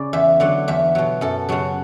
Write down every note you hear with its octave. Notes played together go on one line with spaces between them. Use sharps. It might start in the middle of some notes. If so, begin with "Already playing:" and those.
Already playing: C#3 D5
E2 E5
D3 F#3 F#5
E2 E5
B2 F#3
F#2 A4
C#3 F#3 F#4